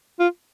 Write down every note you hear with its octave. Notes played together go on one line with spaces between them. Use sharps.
F4